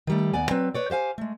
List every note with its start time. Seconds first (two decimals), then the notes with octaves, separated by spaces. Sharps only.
0.07 D#3 G3 A3
0.34 D#2 B3 D5 G#5
0.51 F#3 C4 B4
0.74 B4 C#5 D5
0.90 G4 C5 F5 G#5
1.18 G#3 A3